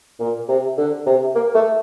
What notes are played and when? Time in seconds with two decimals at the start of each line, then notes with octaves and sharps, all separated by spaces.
0.20 A#2
0.48 C3
0.78 D3
1.06 C3
1.35 A#3
1.55 A3